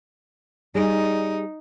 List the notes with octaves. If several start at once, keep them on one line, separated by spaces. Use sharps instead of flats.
G3 D#4 G#4 D5